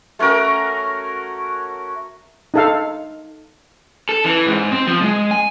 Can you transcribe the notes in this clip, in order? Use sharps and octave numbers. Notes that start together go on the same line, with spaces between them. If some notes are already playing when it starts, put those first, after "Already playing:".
A3 C#4 F#4 A#4
D#4 A4 F5
A4
E3
G#2
C4
F3
G#3
G#5